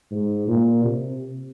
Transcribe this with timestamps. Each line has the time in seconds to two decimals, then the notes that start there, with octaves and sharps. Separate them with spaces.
0.11 G#2
0.48 A#2
0.84 C3